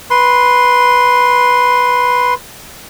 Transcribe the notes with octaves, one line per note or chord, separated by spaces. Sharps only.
B4 C6